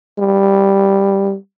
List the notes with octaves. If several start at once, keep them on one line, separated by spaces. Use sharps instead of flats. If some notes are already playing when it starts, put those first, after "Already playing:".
G3